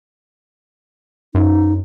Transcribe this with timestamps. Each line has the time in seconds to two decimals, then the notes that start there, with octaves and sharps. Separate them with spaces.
1.35 F#2 D#4